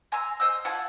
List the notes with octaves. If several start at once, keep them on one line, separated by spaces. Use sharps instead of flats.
G#5 A#5 C6 E6
C5 D#5 E6
F4 F#5 G#5 A5